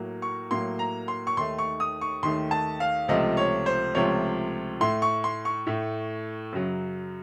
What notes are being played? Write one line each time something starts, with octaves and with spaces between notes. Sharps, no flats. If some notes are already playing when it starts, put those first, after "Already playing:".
Already playing: A2 F#3 A#3
C#6
A2 F#3 A#3 C6
A#5
C6
C#6
D#2 D#3 A3 C6
C#6
D#6
C#6
D#2 D#3 A3 C6
A5
F5
C#2 C3 F3 A3 D#5
C#5
C5
C#2 C3 F3 A3 C#5
A2 A3 C6
C#6
C6
C#6
A2 A3
F#2 C#3 F#3